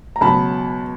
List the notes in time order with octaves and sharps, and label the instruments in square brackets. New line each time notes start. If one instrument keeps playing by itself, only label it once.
[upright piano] A#5
C#2 B2 F#3 A5 B5